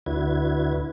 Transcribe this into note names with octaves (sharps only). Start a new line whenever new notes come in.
D2 D3 E4 F#4 B4 G#6